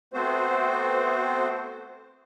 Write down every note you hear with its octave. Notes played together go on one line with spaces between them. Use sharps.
A3 B3 C4 F#4 C5